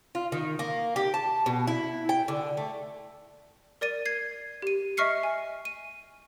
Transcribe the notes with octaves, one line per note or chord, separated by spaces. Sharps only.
F4
D#3
A#3
G4
A5
B2
E4
G5
D3
A3
A#4 D5 A6 D#7
G#6 C7
G4 D#7
D#5 E5 C#6 F6 C7 C#7
G#5
D#7